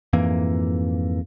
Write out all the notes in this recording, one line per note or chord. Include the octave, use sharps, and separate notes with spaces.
F2 G#2 E3 A#3